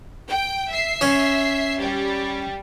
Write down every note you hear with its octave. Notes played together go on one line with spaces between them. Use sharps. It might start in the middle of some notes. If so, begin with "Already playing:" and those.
G5
E5 C7
C#4
G3 G4